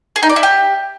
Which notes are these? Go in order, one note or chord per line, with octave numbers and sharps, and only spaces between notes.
G#4
D#4
D5
E4
G4